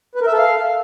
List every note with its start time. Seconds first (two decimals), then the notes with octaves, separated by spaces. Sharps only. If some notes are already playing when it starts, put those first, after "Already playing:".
0.15 B4
0.21 A#4
0.27 E5
0.33 A4
0.38 F5